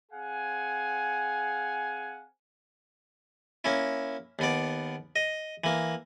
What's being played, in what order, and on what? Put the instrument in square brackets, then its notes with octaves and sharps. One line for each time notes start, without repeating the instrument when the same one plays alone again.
[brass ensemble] C4 G#4 F5 F#5 G#5
[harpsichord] A#3 C#4 E4
D#2 B3 D5
D#5
E3 A#3